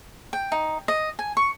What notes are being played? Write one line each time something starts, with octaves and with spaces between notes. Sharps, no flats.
G5
D#4
D#5
G#5
C#6